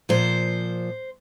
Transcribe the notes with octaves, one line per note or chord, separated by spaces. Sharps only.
A#2 F3 C5